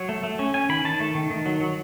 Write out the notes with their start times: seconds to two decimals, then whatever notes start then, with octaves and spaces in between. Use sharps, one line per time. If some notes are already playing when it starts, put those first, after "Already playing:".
Already playing: F#3 C#5
0.09 A3
0.23 A3
0.39 C#4
0.54 C#4 G#5
0.69 D#3 B5
0.84 D#3 A5
1.00 A3
1.15 D#3
1.30 D#3
1.46 F#3
1.60 F#3